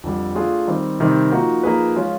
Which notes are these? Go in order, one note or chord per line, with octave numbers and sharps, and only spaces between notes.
F2 D3 G3
A3 D4 F4 G#4
D#3 G3 C4
C3 D#3 G3 C4
F3 A#3 D#4 F#4
F3 A#3 D#4 G#4 B4
F3 G#3 C#4 F4